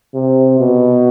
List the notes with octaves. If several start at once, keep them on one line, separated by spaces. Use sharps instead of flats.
C3
B2